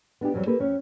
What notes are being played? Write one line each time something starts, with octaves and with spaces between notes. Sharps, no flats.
B3 D4 D#4 G4
F2 E3 F#3 G3
A#3 G4 A4 B4
F2 C#4 C#5